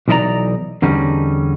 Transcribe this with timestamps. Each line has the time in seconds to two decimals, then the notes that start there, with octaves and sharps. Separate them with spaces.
0.08 B1 E3 D#4 E4 D5 A#5
0.82 E2 D3 G3 C#4 D#4